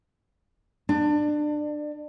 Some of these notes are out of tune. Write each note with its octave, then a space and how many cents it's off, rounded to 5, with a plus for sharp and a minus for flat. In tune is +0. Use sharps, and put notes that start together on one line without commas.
D4 +25